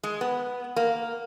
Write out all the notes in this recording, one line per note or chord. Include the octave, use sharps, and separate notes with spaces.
G#3
B3
A#3